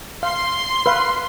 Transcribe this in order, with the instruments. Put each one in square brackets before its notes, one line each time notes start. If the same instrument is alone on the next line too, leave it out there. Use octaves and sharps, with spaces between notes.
[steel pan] F5 [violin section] C6
[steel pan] B4 F5